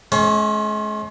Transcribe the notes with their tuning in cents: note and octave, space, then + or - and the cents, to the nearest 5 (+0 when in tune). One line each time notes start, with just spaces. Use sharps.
G#3 +40 C#4 +0